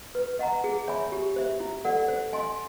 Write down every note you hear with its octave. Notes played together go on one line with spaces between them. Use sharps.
B4
D#5 F#5 A#5
G#4
C#5 E5 G#5 B5
G4
C5 E5
E4
A4 D5 F#5
C5
D#5 G#5 C6